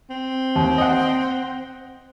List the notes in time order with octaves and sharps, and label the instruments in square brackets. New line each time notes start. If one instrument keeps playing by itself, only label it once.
[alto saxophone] C4
[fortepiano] D#2
D#5 F#5